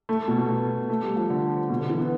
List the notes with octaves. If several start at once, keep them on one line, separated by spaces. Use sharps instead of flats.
A3
B2
B2
B2
A3
G3
F3
D3
B2
D3
E3
B3